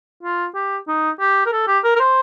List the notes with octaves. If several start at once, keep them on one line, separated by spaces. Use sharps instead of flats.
F4
G4
D#4
G4
A#4
A4
G4
A#4
A#4
C5